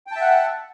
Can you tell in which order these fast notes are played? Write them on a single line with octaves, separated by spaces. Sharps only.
G5 A5 E5 F#5